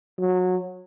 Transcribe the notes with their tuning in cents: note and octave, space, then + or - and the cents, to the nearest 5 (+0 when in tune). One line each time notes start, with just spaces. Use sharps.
F#3 -20